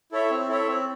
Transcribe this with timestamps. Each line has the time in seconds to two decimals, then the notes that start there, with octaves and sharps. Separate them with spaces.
0.12 E4 A4 C#5 E5
0.30 C4
0.49 E4 A4 C#5 E5
0.67 C4